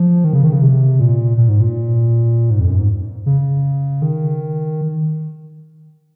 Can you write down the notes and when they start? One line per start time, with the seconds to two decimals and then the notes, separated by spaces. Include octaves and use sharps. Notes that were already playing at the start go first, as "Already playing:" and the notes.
Already playing: F3
0.24 D#3
0.33 C#3
0.44 D#3
0.52 C#3
0.62 C3
0.99 A#2
1.37 A#2
1.49 G#2
1.60 A#2
2.50 G#2
2.60 F2
2.69 F#2
2.79 G#2
3.26 C#3
4.02 D#3